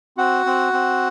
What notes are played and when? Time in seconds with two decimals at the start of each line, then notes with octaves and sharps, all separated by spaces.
0.17 C4 F#4 F#5
0.46 C4
0.73 C4